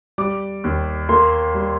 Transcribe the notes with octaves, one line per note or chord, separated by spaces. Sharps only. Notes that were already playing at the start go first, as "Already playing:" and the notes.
G3 D6
D#2
A#3 C6
G3